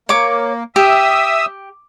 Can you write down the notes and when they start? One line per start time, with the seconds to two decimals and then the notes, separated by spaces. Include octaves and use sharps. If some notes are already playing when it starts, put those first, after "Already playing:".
0.09 A#3 C#5 D6
0.76 G4 E5 D#6 E6